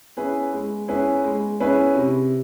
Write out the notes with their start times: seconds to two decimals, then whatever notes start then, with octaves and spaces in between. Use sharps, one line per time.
0.17 C#4 E4 G#4 B4
0.53 G#3
0.88 C#4 E4 G#4 B4
1.24 G#3
1.60 C#4 E4 G#4 B4
1.96 C3